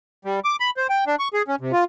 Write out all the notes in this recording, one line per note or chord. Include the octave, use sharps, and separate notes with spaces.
G3
D6
B5
C5
G5
D4
C#6
G#4
C#4
C3
F4